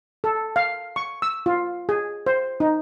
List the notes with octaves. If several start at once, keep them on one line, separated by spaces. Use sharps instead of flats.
A4
F5
C#6
E6
F4
G#4
C5
D#4